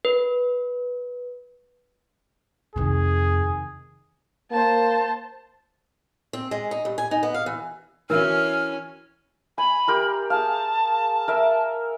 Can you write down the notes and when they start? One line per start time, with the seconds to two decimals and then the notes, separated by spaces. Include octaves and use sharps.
0.05 B4
2.76 F2 C3 D#3 G#4
4.51 A#3 C5 A5
6.33 C4
6.51 G#3
6.71 D#4
6.85 G2
6.98 G#5
7.11 D#4
7.23 B3
7.34 F5
7.46 E3
8.10 E3 C#4 E4 F#4 A#4 G#5 F6
9.58 G#5 B5
9.88 G4 A#4 C6
10.30 G#4 F5 A5
11.28 A#4 E5